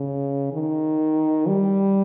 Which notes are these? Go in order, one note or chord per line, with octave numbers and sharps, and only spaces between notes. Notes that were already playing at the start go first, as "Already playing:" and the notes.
Already playing: C#3
D#3
G3